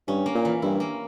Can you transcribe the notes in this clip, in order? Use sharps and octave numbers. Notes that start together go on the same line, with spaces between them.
G2 C#4
A#3
A#2
E3
G2 E4
A#3